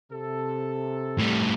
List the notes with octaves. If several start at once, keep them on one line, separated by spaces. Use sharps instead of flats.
C3 A4
A2 G3